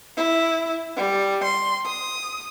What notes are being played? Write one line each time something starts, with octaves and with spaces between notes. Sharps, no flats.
E4
G3
C6
D#6